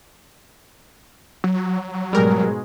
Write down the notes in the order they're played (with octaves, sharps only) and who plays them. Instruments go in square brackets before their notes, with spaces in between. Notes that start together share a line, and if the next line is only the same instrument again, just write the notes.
[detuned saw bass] F#3
[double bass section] G#2 B2 G#3 [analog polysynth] G3 A#4